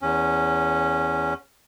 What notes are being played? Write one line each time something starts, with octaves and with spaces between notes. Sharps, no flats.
E2 C#4